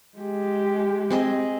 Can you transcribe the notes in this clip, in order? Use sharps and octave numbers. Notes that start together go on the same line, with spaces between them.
G#3 G4
C4 G#4 D#5